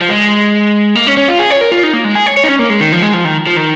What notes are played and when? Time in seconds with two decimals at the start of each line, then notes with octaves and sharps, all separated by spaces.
0.01 F3
0.09 G#3
0.95 A#3
1.07 C#4
1.17 C#4
1.28 F4
1.39 G#4
1.50 C#5
1.61 A#4
1.72 F4
1.83 D#4
1.93 A#3
2.04 G#3
2.15 G#4
2.26 C#5
2.37 C#5
2.44 D#4
2.49 C#4
2.59 A#3
2.70 G#3
2.81 D#3
2.92 F3
3.02 G#3
3.13 F3
3.25 D#3
3.47 F3
3.57 D#3